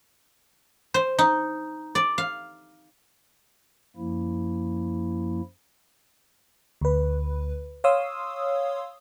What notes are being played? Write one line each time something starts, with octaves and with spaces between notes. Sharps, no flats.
C5
D#4
D5
F5
F#2 F3 A#3 E4
D2 B4
C#5 F5 C6 D#6 E6